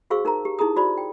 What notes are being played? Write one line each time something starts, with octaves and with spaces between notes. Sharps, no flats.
F#4 G#4 C5 F5 C#6 E6
D#4 A#4 C5 A#5
G4
D#4 E4 G#4 A#5 D#6
F#4 C5 D5 B5
G5